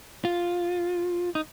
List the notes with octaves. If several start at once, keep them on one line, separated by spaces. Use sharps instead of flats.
F4
D#4